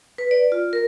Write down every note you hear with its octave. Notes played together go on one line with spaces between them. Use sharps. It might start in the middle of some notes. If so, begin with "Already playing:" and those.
B4
D5
F4
A#4